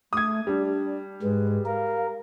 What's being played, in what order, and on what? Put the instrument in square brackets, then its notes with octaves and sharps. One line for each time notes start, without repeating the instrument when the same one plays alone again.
[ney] A3 [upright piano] D#6 G#6
[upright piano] G3 [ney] D4
[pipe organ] G#2 G#3 [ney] B4
[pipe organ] A#4 [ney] F5